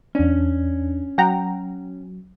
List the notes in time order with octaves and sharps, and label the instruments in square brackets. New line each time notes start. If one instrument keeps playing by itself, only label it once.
[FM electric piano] E2 D4 [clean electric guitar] C#4
[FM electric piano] F#3 [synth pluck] F#5 G5 A#5